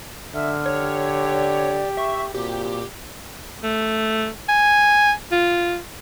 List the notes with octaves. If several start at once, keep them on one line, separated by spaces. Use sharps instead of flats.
D3 E5 F6
G4 C#5
D5
E5 C#6
A#2 C4 F#4 G4
A3
G#5
F4